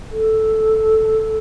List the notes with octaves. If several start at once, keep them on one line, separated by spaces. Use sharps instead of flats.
A4